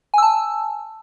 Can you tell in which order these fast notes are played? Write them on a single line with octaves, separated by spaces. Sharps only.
G#5 E6 A5